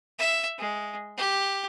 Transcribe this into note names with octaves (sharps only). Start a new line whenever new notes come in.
E5
G#3
G4